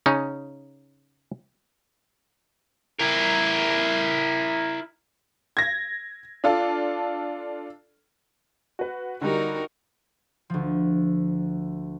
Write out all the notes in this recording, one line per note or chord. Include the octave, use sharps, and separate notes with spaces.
C#3 C#4 D#4
E4 A#4
G#6 A#6
D4 F4 A4
F#4 B4
D3 G3 D#4 F#4 A#4
D2 F3